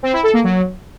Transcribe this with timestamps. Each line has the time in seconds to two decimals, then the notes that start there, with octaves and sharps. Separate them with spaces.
0.03 C4
0.13 E4
0.23 A4
0.34 A#3
0.44 F#3